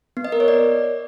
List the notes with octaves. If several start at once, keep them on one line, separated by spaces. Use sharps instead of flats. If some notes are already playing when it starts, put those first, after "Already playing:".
B3
D#5
A#4
C#5
D5